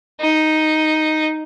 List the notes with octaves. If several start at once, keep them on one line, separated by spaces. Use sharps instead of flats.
D#4